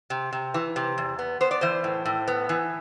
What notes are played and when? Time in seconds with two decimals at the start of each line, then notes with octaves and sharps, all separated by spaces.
0.10 C3
0.33 C3
0.54 E3
0.76 C3
0.98 E2
1.19 B3
1.41 B3 C5
1.51 D5
1.61 E3 C5
1.84 A2
2.05 A2
2.28 B3
2.49 E3